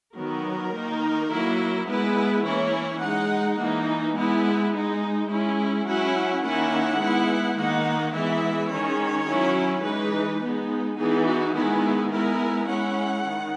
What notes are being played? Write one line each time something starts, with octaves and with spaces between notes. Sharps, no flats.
D#3 F#3 B3 A#4
D#3 A#3 D#4
F#3 A#3 E4
G#3 B3 E4 B4
E3 A#3 C#4 E4 C#5
G#3 D#4 F#5
E3 A#3 D#4
G#3 B3 E4
G#3 D#4
G#3 C#4 E4
F#3 C#4 E4 F#5
D#3 A#3 C#4 E4 F#5
G#3 B3 E4
D#3 A#3 D#4 F#5
E3 G#3 B3 E4 E5
D#3 G#3 C#4 C#5
F#3 C#4 E4
E3 G#3 D#4 B4
G#3 B3 D#4
E3 B3 D#4 G#4
F#4
D#3 G#3 B3 E4 G#4
G#3 B3 E4 A#4
G#3 C#4 E4 F#5
D#3